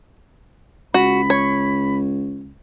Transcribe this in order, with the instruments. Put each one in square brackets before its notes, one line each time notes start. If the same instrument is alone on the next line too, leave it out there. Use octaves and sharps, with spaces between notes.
[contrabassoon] C#2 [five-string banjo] F#4 [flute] B5
[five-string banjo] C#5